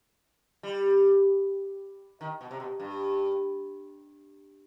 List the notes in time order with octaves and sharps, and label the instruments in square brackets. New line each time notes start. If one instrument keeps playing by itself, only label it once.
[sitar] G3
D#3
B2
C3
B2
G2